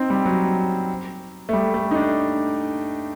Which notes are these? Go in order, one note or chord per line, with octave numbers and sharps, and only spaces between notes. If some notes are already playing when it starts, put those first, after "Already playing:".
Already playing: C4 D#4
G3
F#3
A3
G3
A3
D#4
D4